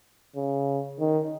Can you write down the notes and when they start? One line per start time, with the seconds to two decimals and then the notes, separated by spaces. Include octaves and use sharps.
0.36 C#3
1.00 D#3